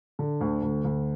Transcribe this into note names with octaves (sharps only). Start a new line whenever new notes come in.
D3
D2
D2
D2